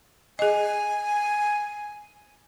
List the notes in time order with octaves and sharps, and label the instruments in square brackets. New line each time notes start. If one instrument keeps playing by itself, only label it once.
[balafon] G#4 D#5 [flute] G#5